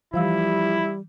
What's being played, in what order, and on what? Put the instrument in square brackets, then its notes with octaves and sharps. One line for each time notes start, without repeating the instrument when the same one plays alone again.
[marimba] E3 F5 E6 [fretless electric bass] F3 [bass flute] G3 [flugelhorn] E4